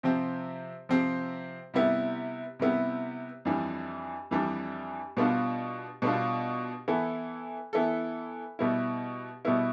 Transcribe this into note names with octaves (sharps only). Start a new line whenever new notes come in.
C3 F3 C4 G4
C3 F3 C4 G4
C3 G3 B3 E4 G4
C3 G3 B3 E4 G4
F2 E3 G3 D4
F2 E3 G3 D4
B2 G3 B3 D4 F4
B2 G3 B3 D4 F4
E3 B3 E4 A4
E3 B3 E4 A4
B2 G3 B3 E4
B2 G3 B3 E4